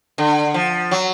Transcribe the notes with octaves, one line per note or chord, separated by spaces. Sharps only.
D3
F3
F#3